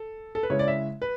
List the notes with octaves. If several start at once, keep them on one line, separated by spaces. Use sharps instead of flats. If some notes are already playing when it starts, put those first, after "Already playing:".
Already playing: A4
A4
B4
C#3 G#3 C#4 E4 C#5
D5
E5
B4